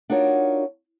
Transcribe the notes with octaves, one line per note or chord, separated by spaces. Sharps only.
D4 D#4 F4 F#4 A#4 C#5